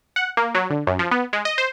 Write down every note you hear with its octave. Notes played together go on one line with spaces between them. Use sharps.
F#5
A#3
F#3
D3
F#2
F3
B3
G#3
D#5
C5